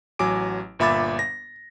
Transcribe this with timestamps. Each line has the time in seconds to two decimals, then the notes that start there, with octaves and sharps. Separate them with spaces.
0.19 A1 F#3 G#5 D6 D7
0.79 G1 A#2 E5 B5 D6 A6
1.19 A#6